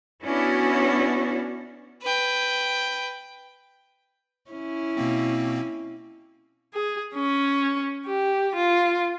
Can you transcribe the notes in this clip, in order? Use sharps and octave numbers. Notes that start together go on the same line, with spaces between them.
B3 C#4 D4 E4 F#4
B4 G5
C#4 E4
B2 A#3 C4
G#4
C#4
G4
F4